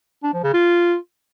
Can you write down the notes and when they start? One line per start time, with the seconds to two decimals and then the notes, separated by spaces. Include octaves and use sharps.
0.23 D4
0.33 F3
0.43 C#3
0.54 F4